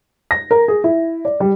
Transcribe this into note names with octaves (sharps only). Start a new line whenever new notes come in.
A#6
A#4
G#4
E4
D5
G3